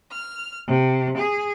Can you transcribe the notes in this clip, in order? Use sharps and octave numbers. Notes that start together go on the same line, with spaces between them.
F6
C3
G#4